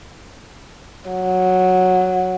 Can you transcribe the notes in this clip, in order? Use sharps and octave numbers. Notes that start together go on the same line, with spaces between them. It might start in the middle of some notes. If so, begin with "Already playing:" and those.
F#3